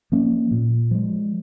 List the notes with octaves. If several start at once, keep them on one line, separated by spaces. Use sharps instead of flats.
F3 A#3 C#4
A#2
F3 G#3